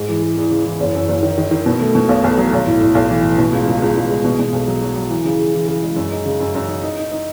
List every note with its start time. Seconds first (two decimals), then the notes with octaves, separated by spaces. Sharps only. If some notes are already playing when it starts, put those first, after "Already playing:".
Already playing: G#2 G#3
0.09 E3
0.23 G#3
0.36 E2
0.51 C#3
0.65 E3
0.80 F#1
0.95 F#2
1.09 F#1
1.23 D#3
1.38 D#3
1.51 D#3
1.66 B2
1.80 A3
1.95 B2
2.09 B1
2.24 B1
2.37 F#3
2.53 B1
2.66 A2
2.81 A2
2.95 B1
3.10 E3
3.23 A2
3.38 B2
3.53 C#2
3.68 C#2
3.82 C#2
3.96 C#2
4.10 G#3
4.25 B2
4.39 B2
4.53 B1
4.67 F#3
4.82 F#3
4.96 F#3
5.10 E3
5.25 C#3
5.39 C#3
5.54 E3
5.68 C#3
5.83 G#3
5.96 F#2
6.11 D#4
6.25 C#3
6.40 F#2
6.55 F#2
6.68 D#4
6.83 D#4
6.97 D#4
7.11 D#4